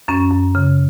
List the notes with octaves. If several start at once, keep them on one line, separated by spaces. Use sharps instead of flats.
F#2 C#4
F#2
C#3